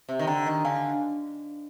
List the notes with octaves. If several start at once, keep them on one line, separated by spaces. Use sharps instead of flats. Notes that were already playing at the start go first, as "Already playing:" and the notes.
C3
D#3
D3 G5 A#5
D#3
D3 F5 G#5